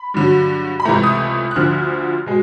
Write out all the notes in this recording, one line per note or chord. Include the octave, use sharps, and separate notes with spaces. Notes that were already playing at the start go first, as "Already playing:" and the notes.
Already playing: B5
G2 D3 F#3
B5
C#2 C3 E3 A3 A#5
D#6
F#6
D2 D3 F3 F6
B2 G#3